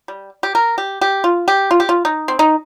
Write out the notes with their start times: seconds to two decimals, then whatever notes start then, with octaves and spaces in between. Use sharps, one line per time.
0.08 G3
0.43 G4
0.55 A#4
0.78 G4
1.01 G4
1.24 F4
1.48 G4
1.71 F4
1.80 G4
1.89 F4
2.05 D#4
2.28 C4
2.39 D#4